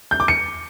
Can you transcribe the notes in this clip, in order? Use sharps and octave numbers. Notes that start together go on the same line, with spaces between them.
G6
D6
C#7